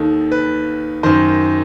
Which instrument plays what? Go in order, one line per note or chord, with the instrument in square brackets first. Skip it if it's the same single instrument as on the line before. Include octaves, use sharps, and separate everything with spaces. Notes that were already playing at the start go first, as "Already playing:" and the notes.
Already playing: [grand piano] D#2 D#3 A4
B4
F#2 D#3 C5